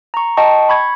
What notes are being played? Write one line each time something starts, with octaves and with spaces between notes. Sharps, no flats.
A#5 C#6
D#5 G5 A5 C#6
B5 C#6 G#6